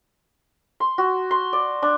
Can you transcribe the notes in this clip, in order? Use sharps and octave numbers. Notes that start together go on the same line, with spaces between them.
C6
F#4
C6
D5
D4